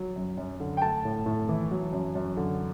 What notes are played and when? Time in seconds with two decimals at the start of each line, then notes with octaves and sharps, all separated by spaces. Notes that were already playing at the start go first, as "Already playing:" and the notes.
Already playing: F#3
0.16 F#2
0.38 F#2
0.60 D3
0.77 G5
0.82 A3 A5
1.05 A2
1.26 A2
1.49 E3
1.71 F#3
1.93 F#2
2.15 F#2
2.37 D3